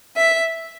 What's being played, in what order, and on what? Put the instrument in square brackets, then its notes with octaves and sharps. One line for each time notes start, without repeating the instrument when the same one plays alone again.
[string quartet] E5